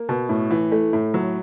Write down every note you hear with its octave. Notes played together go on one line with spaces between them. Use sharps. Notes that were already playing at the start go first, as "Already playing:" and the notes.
Already playing: A#3
B2
A2
E3
A3
A2
F#3